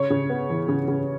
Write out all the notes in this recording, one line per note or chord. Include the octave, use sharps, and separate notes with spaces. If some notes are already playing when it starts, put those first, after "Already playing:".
Already playing: C#3 C#5
C#3
B3
E3
C#3
C#3